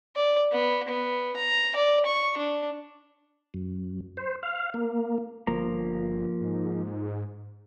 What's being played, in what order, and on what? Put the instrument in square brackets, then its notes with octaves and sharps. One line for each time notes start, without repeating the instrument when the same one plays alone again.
[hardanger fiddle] D5
B3
B3
A#5
D5
C#6
D4
[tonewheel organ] F#2
C5
F5
A#3
[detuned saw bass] G1 [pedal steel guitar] F3 A#3 A#5
[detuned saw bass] G#2